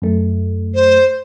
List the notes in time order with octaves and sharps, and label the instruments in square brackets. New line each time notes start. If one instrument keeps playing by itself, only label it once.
[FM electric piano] F#2 A3
[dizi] C5